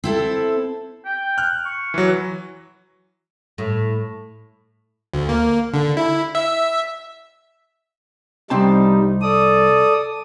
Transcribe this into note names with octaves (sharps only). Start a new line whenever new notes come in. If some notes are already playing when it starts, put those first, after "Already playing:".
C4 E4 A4
G5
F6 F#6
C#6
E3 F#3
A2
D2
A#3
D3
E4
E5
C2 G3 C4 D#4 A5
A4 D5 D#6